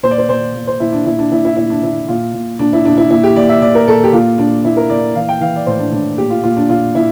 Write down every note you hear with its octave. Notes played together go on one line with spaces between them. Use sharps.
A#2 C5
D5
C5
A#2 C5
A#2
C5
A#2 E4
D4
A#2 E4
D4
A#2 E4
E4
A#2 E4
D4
A#2 E4
A#2 F4
A#2
A#2 D4
E4
A#2 D4
E4
A#2 E4
G4
A#2 D5
E5
A#2 D5
A#4
A#2 A4
G4
A#2 F4
A#2 D4
A#2 E4
A#4
A#2 D5
E3 F5
G5
E3 F5
D5
A2 C5
D4
A2 D4
A#2 G4
F4
A#2 F4
D4
A#2 F4
A#2 E4